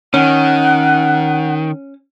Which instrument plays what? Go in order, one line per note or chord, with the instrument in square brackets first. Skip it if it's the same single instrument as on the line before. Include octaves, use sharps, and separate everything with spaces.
[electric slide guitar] D#3 [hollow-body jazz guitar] C#4 [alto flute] F#5